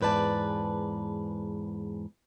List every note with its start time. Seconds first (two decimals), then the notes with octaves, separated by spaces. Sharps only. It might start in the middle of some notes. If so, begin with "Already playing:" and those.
0.01 E2 G#2 B4 D5 A5